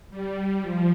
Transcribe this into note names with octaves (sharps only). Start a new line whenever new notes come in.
G3
F3